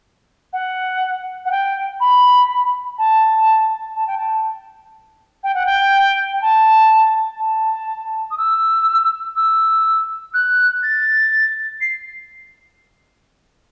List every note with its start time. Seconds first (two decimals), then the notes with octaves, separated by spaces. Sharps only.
0.53 F#5
1.45 F#5
1.51 G5
2.00 B5
2.98 A5
3.96 A5
4.07 G5
4.18 A5
5.44 G5
5.55 F#5
5.66 G5
6.33 G5
6.42 A5
7.40 A5
8.31 D#6
8.38 E6
9.36 E6
10.34 F#6
10.83 A6
11.81 C7